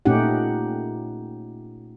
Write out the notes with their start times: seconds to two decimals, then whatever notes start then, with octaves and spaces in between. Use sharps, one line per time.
0.05 A#2 A3 C#4 D#4 G4 F#5